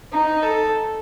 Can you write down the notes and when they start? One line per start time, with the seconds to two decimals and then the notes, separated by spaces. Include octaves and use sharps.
0.13 D#4
0.43 A4